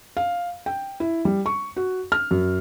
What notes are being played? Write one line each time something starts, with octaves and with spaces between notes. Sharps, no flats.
F5
G5
E4
G3
C#6
F#4
F6
F#2